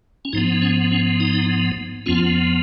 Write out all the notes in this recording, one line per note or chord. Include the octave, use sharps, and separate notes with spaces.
C#4
G#2 F3 B3 D#4
C#4
C#4
D#4
F2 F3 B3 C#4 F4